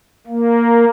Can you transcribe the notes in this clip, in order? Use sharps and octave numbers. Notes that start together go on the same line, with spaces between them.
A#3